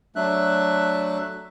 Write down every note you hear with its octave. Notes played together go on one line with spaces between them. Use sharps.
F#3 A3 D4 E5 F#6